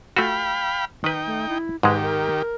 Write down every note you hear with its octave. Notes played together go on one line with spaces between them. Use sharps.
A3 F4 F#4 F5 G5 B5
D#3 D#4 B4 G5
A3
E4
G#2 D#3 G#3 G4 B4
A#4